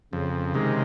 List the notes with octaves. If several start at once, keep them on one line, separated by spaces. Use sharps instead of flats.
F2 C#3
C3 D#3 G#3